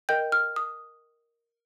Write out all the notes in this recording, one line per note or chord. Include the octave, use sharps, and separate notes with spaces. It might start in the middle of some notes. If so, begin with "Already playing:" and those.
A#4 D#5 G5 G6
F6
D#6